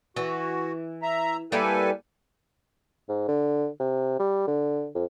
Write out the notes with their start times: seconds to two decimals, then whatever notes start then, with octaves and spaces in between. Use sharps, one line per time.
0.16 E3 F#4
1.02 E5 A#5
1.52 G3 A#3 E4 A4 B4 G#5
3.09 G#2
3.28 D3
3.80 C3
4.19 G3
4.47 D3
4.95 F2